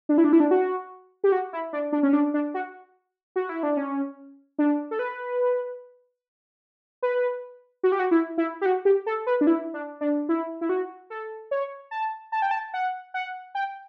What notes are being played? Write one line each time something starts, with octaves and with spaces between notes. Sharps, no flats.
D4
E4
D4
E4
D4
F#4
G4
F#4
E4
D4
D4
C#4
D4
D4
F#4
F#4
E4
D4
C#4
D4
A4
B4
B4
F#4
G4
F#4
E4
E4
G4
F#4
G4
A4
B4
D4
E4
D4
D4
E4
E4
F#4
A4
C#5
A5
A5
G5
A5
F#5
F#5
G5